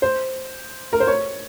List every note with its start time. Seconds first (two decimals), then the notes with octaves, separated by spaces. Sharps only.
0.02 C5
0.93 A#4
1.00 C5
1.07 C#5